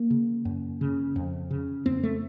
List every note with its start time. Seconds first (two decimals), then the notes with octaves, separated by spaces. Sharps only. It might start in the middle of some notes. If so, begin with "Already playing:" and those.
Already playing: A#3
0.10 C#3
0.45 F#2
0.81 C#3
1.16 F2
1.50 C#3
1.86 F2 C4
2.03 A3